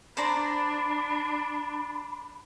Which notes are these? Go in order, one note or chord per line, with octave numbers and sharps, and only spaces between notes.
D4 C5 D5 A#5 B5